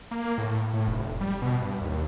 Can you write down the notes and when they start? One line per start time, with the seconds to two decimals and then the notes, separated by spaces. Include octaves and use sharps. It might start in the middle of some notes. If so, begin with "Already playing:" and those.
0.11 A#3
0.38 A2
0.74 A2
0.88 F1
1.21 G3
1.42 B2
1.62 G2
1.81 D#2